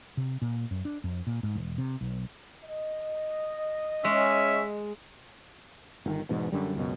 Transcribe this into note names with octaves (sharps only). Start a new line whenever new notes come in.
C3
A#2
F#2
D4
F2
A#2
G#2
E1
C3
B1
D#5
G#3 C#4 E5
G1 D#3
E1 E2 G#2 B2
F#2 D3 G3
C#2 F#2 B2